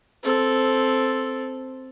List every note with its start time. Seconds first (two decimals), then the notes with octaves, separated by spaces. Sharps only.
0.23 C4 A4